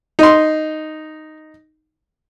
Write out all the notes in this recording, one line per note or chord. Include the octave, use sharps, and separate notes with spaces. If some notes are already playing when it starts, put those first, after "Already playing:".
D#4 C6